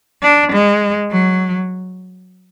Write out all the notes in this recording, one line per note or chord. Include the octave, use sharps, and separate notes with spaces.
D4
G#3
F#3